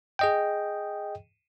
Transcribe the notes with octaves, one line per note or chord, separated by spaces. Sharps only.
G#4 D#5 G5